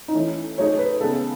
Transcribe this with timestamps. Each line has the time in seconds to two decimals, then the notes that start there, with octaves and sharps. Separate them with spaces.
0.08 D#4
0.14 E3 A3 C#4 E4
0.58 F#3 A3 D#4 G#4 C#5
0.79 B4
1.00 C#3 G#3 B3 A4